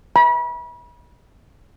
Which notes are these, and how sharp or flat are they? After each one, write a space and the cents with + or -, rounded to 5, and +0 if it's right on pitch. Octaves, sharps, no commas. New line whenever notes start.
B5 -40